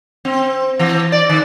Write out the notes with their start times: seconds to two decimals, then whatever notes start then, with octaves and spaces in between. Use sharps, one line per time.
0.25 C4
0.79 E3
1.12 D5
1.29 D#3